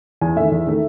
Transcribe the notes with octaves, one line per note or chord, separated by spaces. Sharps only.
E2 G#5
D#3 A3 E5
E2
D#3 A3